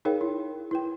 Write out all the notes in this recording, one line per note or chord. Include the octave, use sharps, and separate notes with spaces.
D#4 G#4 A#4 C#5 F5 G5
E4
E4 B4 G5